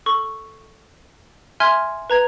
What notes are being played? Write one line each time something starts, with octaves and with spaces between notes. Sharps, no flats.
A4 C#6
E5 G#5 C6 F6 G#6
B4 A#5 G#6